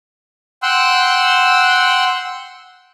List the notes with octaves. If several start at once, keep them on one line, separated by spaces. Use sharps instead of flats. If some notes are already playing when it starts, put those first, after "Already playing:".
F#5 G5 C6 E6 F#6